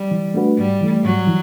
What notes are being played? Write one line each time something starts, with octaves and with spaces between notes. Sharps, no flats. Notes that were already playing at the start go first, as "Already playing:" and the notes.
Already playing: G3
E3
A3 D4 F#4 B4
G#2 G3
E3 A3
G#2 F#3
E3